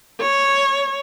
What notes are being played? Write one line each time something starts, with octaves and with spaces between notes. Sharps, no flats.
C#5